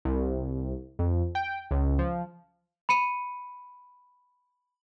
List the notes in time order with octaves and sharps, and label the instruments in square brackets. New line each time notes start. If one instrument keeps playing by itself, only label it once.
[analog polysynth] C2
F2
G5
C#2
F3
[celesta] B5 C#7 D#7